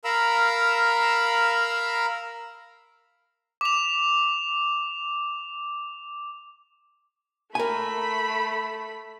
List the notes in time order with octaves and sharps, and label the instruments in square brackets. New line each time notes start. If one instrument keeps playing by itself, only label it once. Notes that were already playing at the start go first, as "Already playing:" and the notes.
[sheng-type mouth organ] A#4 F5 A#5 B5 E6
[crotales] D6 F7
[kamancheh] A3 B5 [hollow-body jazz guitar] A#4 G#5